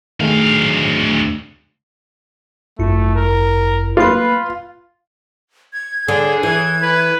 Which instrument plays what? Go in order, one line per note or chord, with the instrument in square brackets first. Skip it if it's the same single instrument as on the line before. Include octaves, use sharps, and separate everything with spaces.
[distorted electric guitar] D2 F5 [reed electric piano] D#3 A3 G#4
[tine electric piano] G1 F#2 E4 [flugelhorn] A3
[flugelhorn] A#4
[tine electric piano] A#3 B5 [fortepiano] F4 [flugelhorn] B4
[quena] G#6
[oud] D3 [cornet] G#4
[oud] E3 [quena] G#6
[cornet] B4